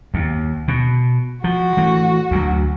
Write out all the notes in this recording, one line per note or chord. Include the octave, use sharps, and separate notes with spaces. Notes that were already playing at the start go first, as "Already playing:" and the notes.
D#2
B2
F3 F#4
E3 A3
D2 F#3